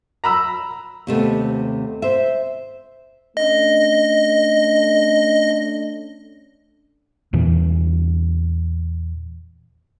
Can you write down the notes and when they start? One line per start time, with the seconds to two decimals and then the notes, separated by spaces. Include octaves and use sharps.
0.24 A#5 B5 E6
1.07 D#2 C3 A3 B3
2.02 C5 E5
3.37 A3 C#4 D4 D#5
7.33 E2 A#2 E3